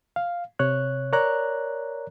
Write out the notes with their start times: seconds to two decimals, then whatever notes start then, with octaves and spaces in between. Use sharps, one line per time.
0.16 F5
0.59 C3 C#5 F#6
1.13 A#4 C#5 D5 A#5 F#6